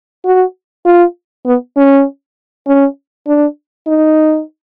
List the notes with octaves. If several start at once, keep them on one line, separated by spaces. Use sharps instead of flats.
F#4
F4
B3
C#4
C#4
D4
D#4